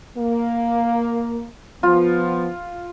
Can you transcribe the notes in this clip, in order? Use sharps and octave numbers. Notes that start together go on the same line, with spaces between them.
A#3
F3 B3 F4